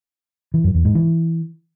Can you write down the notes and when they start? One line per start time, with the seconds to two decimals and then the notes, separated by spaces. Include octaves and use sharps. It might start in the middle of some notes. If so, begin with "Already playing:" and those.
0.54 E3
0.64 F#2
0.74 E2
0.85 G#2
0.95 E3